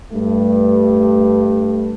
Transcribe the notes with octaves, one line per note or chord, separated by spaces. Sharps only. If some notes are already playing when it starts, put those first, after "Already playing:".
G2 A3